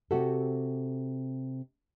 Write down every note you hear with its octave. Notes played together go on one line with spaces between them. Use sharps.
C3 C4 F#4 G4 A4